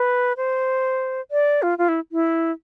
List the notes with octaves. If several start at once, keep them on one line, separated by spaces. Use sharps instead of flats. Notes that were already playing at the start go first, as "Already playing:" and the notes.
Already playing: B4
C5
D5
F4
F4
E4
E4